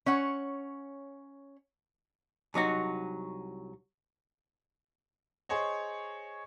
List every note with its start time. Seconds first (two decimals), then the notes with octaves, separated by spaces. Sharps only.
0.06 C#4 C#5 F#5
2.54 C2 F#3 D#4 F#4
5.49 G#4 C5 C#5 D#5